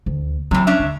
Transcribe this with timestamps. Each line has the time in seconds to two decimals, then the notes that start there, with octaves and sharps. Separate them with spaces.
0.06 D2
0.51 C3 E3 F#3
0.67 C#4 D4 E5
0.80 D2